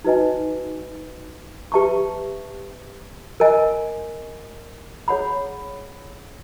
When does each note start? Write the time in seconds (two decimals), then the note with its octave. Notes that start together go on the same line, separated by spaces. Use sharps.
0.04 D#4 F#4 B4 D#5 G#5
1.72 G4 B4 E5 A5 C#6
3.40 A#4 D#5 G#5
5.08 G#4 C#5 F#5 B5